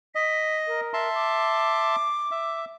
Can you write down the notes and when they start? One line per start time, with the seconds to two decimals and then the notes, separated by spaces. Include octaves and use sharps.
0.15 D#5 B6
0.67 A#4
0.94 E5 A5 C6
1.15 D6
2.31 E5